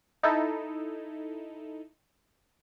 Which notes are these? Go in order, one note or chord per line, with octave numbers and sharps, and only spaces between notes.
D#4 E4 A4